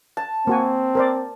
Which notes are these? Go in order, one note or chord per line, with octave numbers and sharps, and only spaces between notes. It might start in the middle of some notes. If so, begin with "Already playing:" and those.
A5
A#3 C4 F#4 G#5
A#4 C5 D5